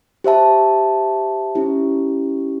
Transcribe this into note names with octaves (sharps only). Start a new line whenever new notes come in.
G4 C5 E5 A5
C#4 E4 G4